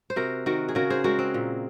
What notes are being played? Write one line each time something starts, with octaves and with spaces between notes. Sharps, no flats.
C5
C3 F#4 A#4
D#3 F#4 A#4
G#4
C#3 F#4 A#4
G#4 C5
G#3 F#4 A#4
C4
A#2